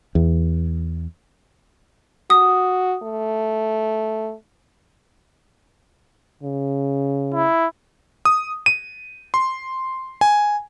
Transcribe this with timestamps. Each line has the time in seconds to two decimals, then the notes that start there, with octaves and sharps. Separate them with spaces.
0.15 E2
2.30 F#4 D#6
3.03 A3
6.43 C#3
7.34 E4
8.25 D#6
8.66 D#7
9.34 C6
10.21 G#5